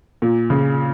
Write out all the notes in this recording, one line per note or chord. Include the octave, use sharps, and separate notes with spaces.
A#2
C#3